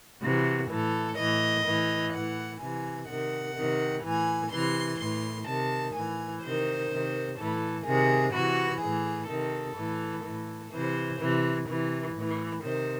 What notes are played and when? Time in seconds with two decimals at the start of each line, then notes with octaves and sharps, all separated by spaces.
0.21 C3 E3 F#4
0.69 A2 E3 A4
1.17 A2 E3 D#5
1.65 A2 E3
2.12 A2 E3 F#5
2.60 C3 E3 G#5
3.08 C3 D#3 F#5
3.56 C3 D#3
4.04 A2 E3 G#5
4.51 C3 E3 C6
4.99 A2 E3 C6
5.47 C3 D#3 A5
5.94 A2 E3 G#5
6.42 C3 D#3 C5
6.90 C3 D#3
7.38 A2 E3 A4
7.85 C3 D#3 G#4
8.33 C3 E3 F#4
8.81 A2 E3 G#4
9.29 C3 D#3 A4
9.77 A2 E3
10.24 A2 E3
10.72 C3 E3 C5
11.20 C3 E3
11.68 C3 E3
12.16 A2 E3
12.63 C3 D#3 C5